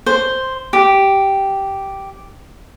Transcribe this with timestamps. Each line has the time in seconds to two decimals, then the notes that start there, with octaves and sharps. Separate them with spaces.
0.06 C5
0.73 G4